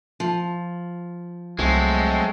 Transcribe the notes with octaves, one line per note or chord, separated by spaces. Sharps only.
F3
C2 F#3 G#3 A3 C4